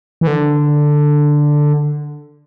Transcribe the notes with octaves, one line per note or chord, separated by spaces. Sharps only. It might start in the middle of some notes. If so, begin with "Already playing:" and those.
E3
D3